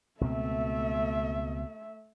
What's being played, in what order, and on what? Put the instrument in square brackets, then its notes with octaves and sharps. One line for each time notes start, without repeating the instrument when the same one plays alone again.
[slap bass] C#2 B2 C4 [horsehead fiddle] A3 E5